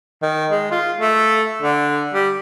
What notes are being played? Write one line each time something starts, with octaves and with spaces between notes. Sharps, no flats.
D#3
G#3
F4
A3
D3
G3